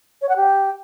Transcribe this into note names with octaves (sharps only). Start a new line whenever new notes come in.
C#5
F#5
G4